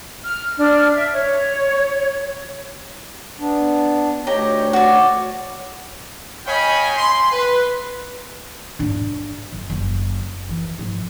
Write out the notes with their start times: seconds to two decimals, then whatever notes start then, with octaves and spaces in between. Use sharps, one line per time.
0.25 F6
0.57 D4 F6
0.96 E5
1.13 C#5
3.39 B3 D4
4.27 D2 D#4 G4 C#5 A#5
4.73 F#4 D5
6.47 C#5 D#5 F5 G5 G#5 B5
6.97 C6
7.32 B4
8.79 G#2 D4
9.52 F#1
9.70 F#1
10.49 E3
10.78 G#2 F3